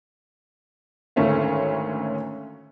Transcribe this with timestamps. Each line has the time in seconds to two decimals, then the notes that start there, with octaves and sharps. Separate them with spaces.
1.16 G#1 D2 A3 C#4 A#4 F5